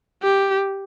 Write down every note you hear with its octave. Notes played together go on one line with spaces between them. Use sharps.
G4